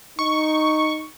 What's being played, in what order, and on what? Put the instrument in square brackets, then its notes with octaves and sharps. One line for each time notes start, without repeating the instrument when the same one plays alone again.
[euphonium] D#4 [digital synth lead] C#6